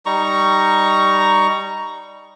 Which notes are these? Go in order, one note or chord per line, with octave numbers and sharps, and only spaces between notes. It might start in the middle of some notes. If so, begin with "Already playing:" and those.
G3 D#4 A#5 C#6